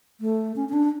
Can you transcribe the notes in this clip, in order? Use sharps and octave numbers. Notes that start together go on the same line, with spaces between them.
A3
C#4
C#4
D4